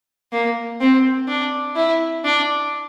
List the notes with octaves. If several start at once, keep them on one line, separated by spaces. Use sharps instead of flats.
A#3
C4
D4
E4
D4